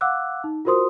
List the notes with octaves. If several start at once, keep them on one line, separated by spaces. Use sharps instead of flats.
F5 F#5 D6 E6 F#6
D#4
F4 F#4 A#4 C5 C6 D#6